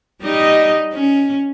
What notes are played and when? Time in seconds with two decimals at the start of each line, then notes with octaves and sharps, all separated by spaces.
0.22 G3 D#4 D#5
0.93 C#4